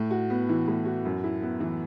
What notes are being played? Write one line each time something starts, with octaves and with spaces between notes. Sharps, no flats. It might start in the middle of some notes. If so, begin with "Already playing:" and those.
Already playing: A2
F#4
B3
E3
A2
F#4
F#2
E4
B3
E3